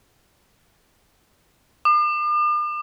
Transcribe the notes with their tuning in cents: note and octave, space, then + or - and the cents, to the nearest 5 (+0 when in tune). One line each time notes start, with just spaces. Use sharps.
D6 +45